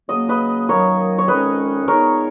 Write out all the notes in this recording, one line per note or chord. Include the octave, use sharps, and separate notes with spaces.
C#3 F#3 A#3 D#5
B4 D#5
F#2 D#3 F#3 A#3 A#4 C#5
C#5
F2 D#3 G#3 C#4 B4 D#5
A#2 G#3 B3 D#4 A#4 C#5